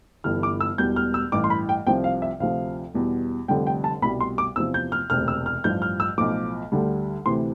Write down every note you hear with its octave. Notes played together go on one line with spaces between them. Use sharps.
G1 G2 E3 G3 F6
D6
E6
E1 E2 B2 G3 G6
F6
E6
A1 G2 E3 D6
C6
B5
G5
C2 C3 F3 G5
F5
E5
D2 C3 F3 F5
E2 B2 G3
F1 F2 D3 G3 G5
G5
A5
C2 B2 G3 B5
C6
D6
E2 C3 F3 E6
G6
F6
E1 D2 C3 F6
E6
F6
A1 G2 F3 G6
F6
E6
B1 A2 F3 D6
D2 D3 G3
D2 C3 E3 C6